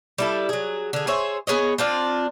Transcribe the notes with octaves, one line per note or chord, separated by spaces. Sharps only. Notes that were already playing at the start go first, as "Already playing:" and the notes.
G3 E4 A4
F#3 G#4
D3 G#4
G#4 C5 C#5 E5
B3 G#4 C#5 D#5
C4 D4 F4